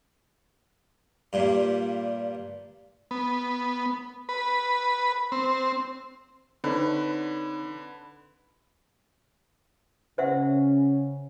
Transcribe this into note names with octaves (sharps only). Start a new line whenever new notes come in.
G2 A#2
B3
B4
C4
D3 C4 D#4 B4 C#5
C#3 C#4 C5 E5 F#5